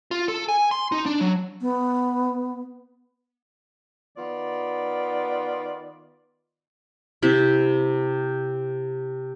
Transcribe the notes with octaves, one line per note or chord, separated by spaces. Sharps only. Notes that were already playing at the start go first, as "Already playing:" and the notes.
F4
A4
G#5
C6
D#4
D4
F#3
B3
D#3 B3 F4 D5
C3 E4